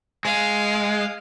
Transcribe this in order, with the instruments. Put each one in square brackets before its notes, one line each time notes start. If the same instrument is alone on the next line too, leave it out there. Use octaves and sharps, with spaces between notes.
[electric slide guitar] G#3 [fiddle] F5